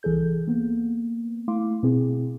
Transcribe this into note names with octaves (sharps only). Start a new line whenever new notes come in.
C2 E3 G#4 A4 G6
A#3 B3
A3 E4 F5 C6 D6
B2 C4 E4 G#4